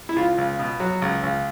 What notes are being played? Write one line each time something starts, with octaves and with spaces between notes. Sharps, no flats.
E4
C#2 F4
C#2
B2
F#3
C#2
C#2